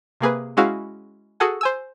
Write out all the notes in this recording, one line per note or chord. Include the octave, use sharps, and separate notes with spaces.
C3 A#3 G#4 B4
G#3 C#4 E4 F#4 G#4 F5
F#4 G#4 A4 F#5 G#5
C5 G#5 E6